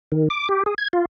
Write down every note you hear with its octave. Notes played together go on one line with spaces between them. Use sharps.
D#3
D6
G4
G#4
G#6
F4